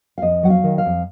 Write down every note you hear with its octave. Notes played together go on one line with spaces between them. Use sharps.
F5
F2 D#5
F#3 F#5
F5
D#3
F5
F2